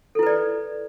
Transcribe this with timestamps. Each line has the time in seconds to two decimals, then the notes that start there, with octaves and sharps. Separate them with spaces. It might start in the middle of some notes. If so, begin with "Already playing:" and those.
0.15 A4
0.19 E4
0.23 B4
0.26 D5